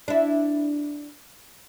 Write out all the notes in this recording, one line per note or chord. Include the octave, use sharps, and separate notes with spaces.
D4 E4